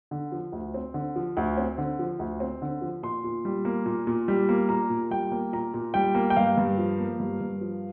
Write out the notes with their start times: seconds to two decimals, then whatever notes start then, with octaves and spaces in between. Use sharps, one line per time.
0.11 D3
0.32 F3
0.52 D2
0.74 C4
0.94 D3
1.16 F3
1.37 D2
1.57 C4
1.78 D3
1.99 F3
2.19 D2
2.40 C4
2.62 D3
2.81 F3
3.03 A#2 C6
3.24 A#2
3.45 G3
3.65 A#3
3.86 A#2
4.07 A#2
4.28 G3
4.49 A#3
4.69 A#2 A#5
4.90 A#2
5.11 G3 G5
5.32 A#3
5.53 A#2 A#5
5.74 A#2
5.94 G3 G5
6.15 A#3
6.30 G5
6.37 G2 F5
6.57 G2
6.78 F3
6.99 A#3
7.20 G2
7.41 G2
7.61 F3